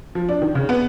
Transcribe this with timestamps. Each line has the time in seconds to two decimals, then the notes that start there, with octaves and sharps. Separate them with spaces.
0.15 F3
0.29 D4
0.42 D#3
0.55 C#3
0.69 B3